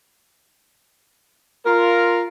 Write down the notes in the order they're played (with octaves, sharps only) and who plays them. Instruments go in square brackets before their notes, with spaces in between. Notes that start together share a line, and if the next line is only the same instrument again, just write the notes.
[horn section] F4 A#4